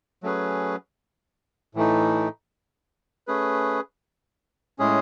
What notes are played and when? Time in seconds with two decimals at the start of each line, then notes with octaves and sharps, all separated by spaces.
0.23 F#3 A3 C#4 G#4 B4
1.75 A2 E3 A3 D#4
3.27 A3 C#4 G#4 B4
4.79 A2 G#3 C#4 G#4